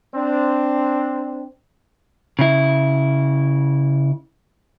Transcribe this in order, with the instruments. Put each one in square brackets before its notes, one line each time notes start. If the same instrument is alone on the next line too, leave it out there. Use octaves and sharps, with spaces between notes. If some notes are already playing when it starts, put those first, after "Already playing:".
[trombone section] C4 D4
[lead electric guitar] C#3 E4